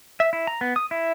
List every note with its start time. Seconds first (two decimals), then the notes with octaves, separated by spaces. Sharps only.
0.20 E5
0.33 E4
0.47 A#5
0.61 B3
0.76 D#6
0.91 E4